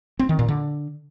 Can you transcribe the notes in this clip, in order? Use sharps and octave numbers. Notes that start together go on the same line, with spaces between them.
C4
D#3
A#2
D3